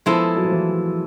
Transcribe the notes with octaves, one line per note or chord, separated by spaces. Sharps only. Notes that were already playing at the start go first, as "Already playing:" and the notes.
F3 G#3 B3 E4 A4
F#3
F3
E3